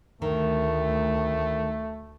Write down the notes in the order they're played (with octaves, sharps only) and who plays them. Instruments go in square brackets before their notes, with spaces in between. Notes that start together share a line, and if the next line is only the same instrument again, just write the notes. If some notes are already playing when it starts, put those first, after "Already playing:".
[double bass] D2 [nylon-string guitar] D#3 [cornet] A3